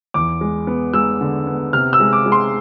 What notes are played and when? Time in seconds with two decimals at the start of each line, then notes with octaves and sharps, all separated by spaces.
0.14 E2 D6
0.41 G#3
0.67 B3
0.94 G#3 E6
1.21 D3
1.47 B3
1.73 C3 F6
1.93 E6
2.00 G#3
2.13 D6
2.26 G#3
2.32 C6